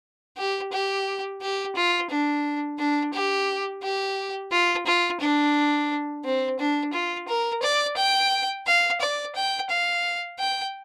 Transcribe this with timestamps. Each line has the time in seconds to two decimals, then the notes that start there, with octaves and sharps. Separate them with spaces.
0.37 G4
0.72 G4
1.41 G4
1.76 F4
2.10 D4
2.79 D4
3.14 G4
3.83 G4
4.52 F4
4.86 F4
5.21 D4
6.24 C4
6.59 D4
6.93 F4
7.28 A#4
7.63 D5
7.97 G5
8.67 F5
9.01 D5
9.36 G5
9.70 F5
10.39 G5